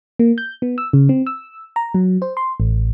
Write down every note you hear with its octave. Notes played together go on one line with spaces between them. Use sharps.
A#3
G6
B3
E6
C#3
C4
E6
A#5
F#3
C5
C6
A1